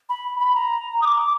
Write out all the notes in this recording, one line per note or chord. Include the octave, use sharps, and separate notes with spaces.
B5
B5
A#5
D#6
D6